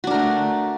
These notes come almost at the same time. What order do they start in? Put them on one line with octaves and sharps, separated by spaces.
F#4 D4 A#4 A3